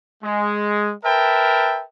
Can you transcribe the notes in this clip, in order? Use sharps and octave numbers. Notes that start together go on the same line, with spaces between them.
G#3
A#4 B4 E5 G5 A5